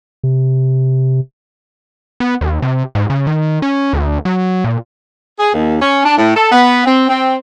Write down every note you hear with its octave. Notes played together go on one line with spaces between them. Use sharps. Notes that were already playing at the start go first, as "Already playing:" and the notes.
C3
B3
D#2
C3
G#2
C#3
D#3
C#4
D2
F#3
A#2
G#4
D#2
C#4
D4
A2
A4
B3
C4
C4